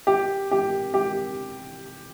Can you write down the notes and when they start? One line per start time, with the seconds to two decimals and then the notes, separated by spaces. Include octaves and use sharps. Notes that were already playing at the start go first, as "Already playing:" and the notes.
0.07 G4
0.51 G4
0.94 G4